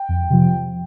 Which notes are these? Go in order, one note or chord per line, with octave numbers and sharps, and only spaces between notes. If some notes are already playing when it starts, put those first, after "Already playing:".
Already playing: G5
F2
C3 F3